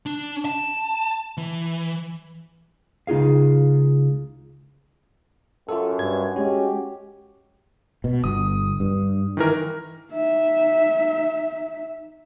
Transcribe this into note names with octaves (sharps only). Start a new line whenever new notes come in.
D4
A5
E3
C#2 D#4 F4 G#4 F5
F#2 F4 A4
G2 G#6
G#3 C#4 F#4 G4
B2
G1 D#6
G2
D#3 E3 A#4
D#4 E5